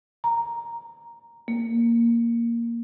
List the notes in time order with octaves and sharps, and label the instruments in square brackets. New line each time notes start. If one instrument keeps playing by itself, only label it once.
[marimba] A#5
A#3